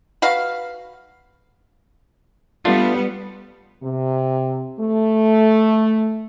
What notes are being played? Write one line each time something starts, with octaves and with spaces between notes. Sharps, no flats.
F#4 B4 F5
G3 A3 B3 D4 F4
C3
A3